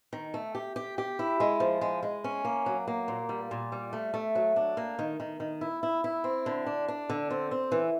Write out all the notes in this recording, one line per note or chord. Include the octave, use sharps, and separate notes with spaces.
D#3
A3
G4
G4
G4
E4
G#3
F3
G#3
G#3
C#4
A#3
F#3
A#3
A#2
G3
A#2
G3
A3
A3
F#3
D4
A#3
D#3
D#3
D#3
E4
E4
E4
C4
D3
D4
D4
D3
C4
C4
E3